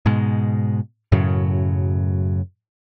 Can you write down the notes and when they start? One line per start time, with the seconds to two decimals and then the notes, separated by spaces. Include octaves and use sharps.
0.06 G#2 B2 G#3
1.12 F#2 A2 C#3 F#3